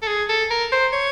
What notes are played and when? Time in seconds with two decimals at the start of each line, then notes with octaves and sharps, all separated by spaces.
0.02 A4
0.08 G#4
0.29 A4
0.50 A#4
0.72 C5
0.93 C#5